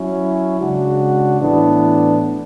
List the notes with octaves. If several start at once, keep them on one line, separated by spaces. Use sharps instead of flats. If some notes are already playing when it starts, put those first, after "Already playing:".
Already playing: F#3 C#4 E4
C#3 G#3 D4 F#4
A2 E3 B3 D4